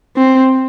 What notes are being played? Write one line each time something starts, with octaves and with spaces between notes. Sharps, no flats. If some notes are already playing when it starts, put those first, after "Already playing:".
C4